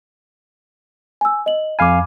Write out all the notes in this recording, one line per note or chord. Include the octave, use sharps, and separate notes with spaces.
G#5 E6
D#5 F#7
F2 F5 G#5 B5 D6